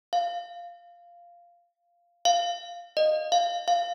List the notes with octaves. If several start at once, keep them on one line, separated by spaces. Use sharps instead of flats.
F5
F5
D#5
F5
F5